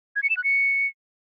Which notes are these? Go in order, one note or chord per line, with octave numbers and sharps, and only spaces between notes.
G#6
C#7
E7
F#6
C#7